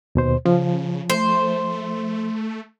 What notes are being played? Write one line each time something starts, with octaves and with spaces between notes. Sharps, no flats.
D#2 B2 C5
C#3 F3
A3 C5